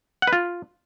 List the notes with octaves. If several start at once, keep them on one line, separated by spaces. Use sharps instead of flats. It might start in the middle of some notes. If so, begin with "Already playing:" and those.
F#5
B4
F4